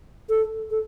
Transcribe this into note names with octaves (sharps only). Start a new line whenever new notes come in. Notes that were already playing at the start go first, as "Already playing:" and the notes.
A4
A4